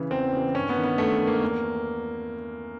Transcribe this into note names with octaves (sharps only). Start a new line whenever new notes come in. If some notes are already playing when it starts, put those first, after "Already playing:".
Already playing: C#3 E3
E2 C4
C#3 E3
G2 C#4
B3
D#3
B3
G2 A3
D#3
A#3
E2